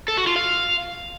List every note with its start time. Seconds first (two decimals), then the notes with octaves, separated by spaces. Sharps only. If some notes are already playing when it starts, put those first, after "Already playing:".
0.08 A4
0.17 F#4
0.27 F4
0.36 F5